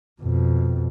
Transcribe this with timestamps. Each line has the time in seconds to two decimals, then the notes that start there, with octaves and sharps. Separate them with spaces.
0.22 F2 B2